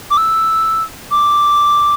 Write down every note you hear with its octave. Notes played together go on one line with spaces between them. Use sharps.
D6
E6
D6